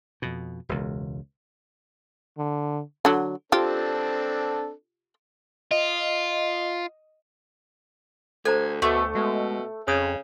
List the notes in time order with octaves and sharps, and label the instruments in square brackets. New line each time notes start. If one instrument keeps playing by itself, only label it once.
[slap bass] F2 B2
E1 C#2
[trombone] D3
[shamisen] D3 F#3
[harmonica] C4 D4 A4 [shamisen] F4 G4
[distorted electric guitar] F4 [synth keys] D#5
[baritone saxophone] D2 [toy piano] A4 C5 A#5 [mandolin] G#5
[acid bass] D2 [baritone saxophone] B2 [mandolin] A3 [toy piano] D6
[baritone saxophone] B2 [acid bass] G#3
[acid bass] F2 [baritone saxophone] C#3 [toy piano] C#5 D#6